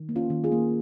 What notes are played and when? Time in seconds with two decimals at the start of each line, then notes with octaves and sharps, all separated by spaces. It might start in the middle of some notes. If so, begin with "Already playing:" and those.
Already playing: D#3
0.09 A#3
0.16 C#4 F4
0.30 D#3
0.44 F4 G#4
0.52 A#3